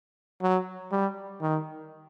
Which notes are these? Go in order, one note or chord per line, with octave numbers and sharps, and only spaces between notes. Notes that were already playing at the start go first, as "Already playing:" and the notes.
F#3
G3
D#3